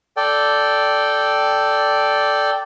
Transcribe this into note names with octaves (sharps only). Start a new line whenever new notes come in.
A4 D5 G5